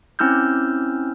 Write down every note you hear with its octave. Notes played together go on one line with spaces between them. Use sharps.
C4 C#4 E4 E6 F6 G6